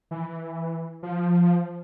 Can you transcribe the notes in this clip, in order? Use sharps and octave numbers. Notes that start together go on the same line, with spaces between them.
E3
F3